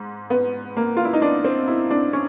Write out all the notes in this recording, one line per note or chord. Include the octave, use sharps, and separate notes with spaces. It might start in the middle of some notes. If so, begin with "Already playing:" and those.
Already playing: G#2
B3
A#3
F4
E4
D#4
D4
C4
E4
D4
C#4